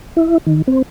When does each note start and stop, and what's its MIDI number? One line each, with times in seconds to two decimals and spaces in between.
0.17 0.38 64
0.46 0.62 51
0.68 0.82 60